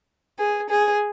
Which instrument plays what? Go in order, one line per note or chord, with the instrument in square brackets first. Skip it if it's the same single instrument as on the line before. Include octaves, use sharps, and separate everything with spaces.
[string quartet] G#4
G#4